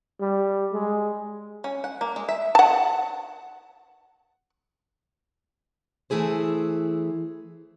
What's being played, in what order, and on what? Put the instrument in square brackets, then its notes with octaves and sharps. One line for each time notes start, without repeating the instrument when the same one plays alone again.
[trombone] G3
G#3
[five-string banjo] C#4
F#5
A#3
G#3
E5
[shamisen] F#5 A5
[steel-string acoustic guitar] E3 A3 E4 G#4 C5